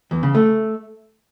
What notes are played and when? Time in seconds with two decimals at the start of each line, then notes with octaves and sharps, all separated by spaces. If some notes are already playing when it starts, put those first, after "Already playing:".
0.11 E2
0.23 C#3
0.35 A3